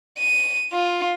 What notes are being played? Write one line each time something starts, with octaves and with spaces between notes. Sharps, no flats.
D#7
F4